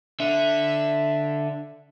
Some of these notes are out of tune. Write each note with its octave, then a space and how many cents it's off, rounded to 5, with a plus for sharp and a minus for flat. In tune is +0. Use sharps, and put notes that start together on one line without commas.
D3 +0 E5 +0